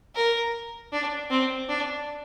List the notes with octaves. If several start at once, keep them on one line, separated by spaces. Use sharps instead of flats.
A#4
D4
C4
D4